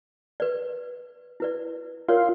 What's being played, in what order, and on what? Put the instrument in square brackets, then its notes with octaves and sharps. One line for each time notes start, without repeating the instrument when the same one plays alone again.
[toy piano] B4 D5
E4 B4 D5
[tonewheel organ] F4 [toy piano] A#4 C#5 D5